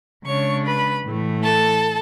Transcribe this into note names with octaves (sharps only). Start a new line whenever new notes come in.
C#3 G#3 D4 C#5 C#6
B4 B5
A2 E3 A3
A4 A5